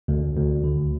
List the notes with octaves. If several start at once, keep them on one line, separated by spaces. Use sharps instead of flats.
D2
D2
D3